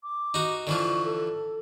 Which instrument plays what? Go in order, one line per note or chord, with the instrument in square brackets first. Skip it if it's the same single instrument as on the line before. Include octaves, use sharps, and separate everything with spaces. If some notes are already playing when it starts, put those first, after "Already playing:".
[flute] D6
[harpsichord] D#4 F#4
[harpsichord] D3 E3 F3 [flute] C#6
[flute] A4